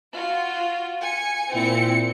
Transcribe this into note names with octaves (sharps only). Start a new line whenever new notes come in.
F4 F#4
G#5 C#7
A#2 C4 E4 C#7